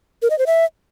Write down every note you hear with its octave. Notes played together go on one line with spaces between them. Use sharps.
A#4
D#5
C5
E5